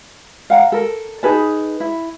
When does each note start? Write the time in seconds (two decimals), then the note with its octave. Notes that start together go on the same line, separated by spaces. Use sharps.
0.50 F5 F#5 A#5
0.72 A4 A#4
1.23 D#4 G#4 B4 A5
1.80 E4